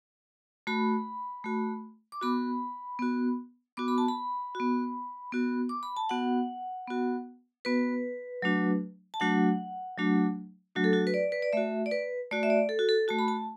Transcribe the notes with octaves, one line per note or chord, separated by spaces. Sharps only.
A3 F#4 B5
A3 F#4
D6
B3 F#4 B5
B3 F#4
B3 F#4 D6
B5
A5
B5
B3 F#4
B3 F#4
D6
B5
A5
B3 F#4 F#5
B3 F#4
B3 F#4 B4
F#3 A3 D4 F#4
A5
F#3 A3 D4 F#4 F#5
F#3 A3 D4 F#4
F#3 A3 D4 F#4
A4
F#4
B4
D5
B4
D5
A3 F#4 E5
D5
B4
A3 F#4 D5
E5
D5
A4
F#4
A4
A3 F#4 A5
B5
A5